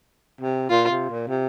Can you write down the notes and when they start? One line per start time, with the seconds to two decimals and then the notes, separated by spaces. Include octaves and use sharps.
0.41 C3
0.70 A#2 F4
0.90 C3
1.10 A#2
1.28 C3